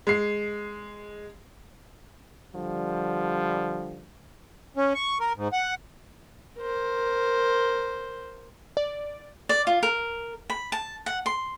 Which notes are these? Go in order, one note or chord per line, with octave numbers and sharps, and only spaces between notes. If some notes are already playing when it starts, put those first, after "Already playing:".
G#3 C7
D3 F3 G3
C#4
C#6
A#4
G#2
F#5
A#4 C5
D5
D5
F4
A#4
B5
A5
F#5
C6